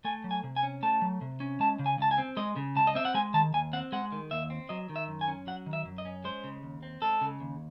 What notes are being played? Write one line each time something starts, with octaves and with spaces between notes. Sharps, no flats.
A3 G#5
F#3
G#5
C3
G#5
C#4
A3 A5
F#3
C3
C#4
G#3 A5
C#3
G#5
C#2 A5
G#5
C4
G#3 D#5
C#3
C#2 A5
D#5
C4 E5
F#5
G#3 G#5
D#3 A5
D#2 G#5
C4 F#5
G#3 F#5
D#3
D#2 E5
C4
F#3 D#5
D#3
E5
F#2
G#5
C#4
F#3 F#5
D#3
E5
F#2
D#5
C#4
G#3 C5
C#3
D#2
C4
G#3 A4
C#3
D#2